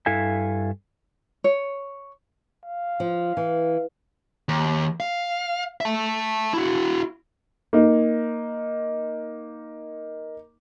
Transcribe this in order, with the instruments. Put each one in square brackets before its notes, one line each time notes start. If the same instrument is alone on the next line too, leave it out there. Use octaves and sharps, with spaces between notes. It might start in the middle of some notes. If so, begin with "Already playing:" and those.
[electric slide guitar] G2 E4 A4 E5 F5 G#5
[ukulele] C#5
[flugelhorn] F5
[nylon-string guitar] F3
E3
[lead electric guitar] D#2
F5
E5 A5
E4 F#4
[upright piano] A#3 D#4